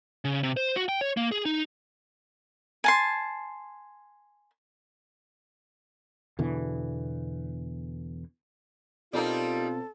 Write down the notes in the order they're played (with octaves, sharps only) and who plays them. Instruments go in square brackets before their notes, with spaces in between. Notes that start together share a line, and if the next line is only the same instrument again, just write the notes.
[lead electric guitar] C#3
C3
C5
F#4
G5
C#5
A#3
G#4
D#4
[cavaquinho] G#5 A5 C6
[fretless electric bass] E2 B2 D3 E3
[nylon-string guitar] B2 C4 D5 [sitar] G3 A#3 D#4 [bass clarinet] F4 [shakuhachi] A4